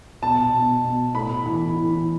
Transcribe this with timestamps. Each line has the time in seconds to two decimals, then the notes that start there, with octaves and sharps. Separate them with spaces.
0.22 B2 A5
0.53 B2
0.84 B2
1.15 A2 B5
1.46 E3
1.76 E3